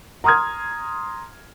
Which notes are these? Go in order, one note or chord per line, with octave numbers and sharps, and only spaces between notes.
A#5 C6 D#6 F6 G#6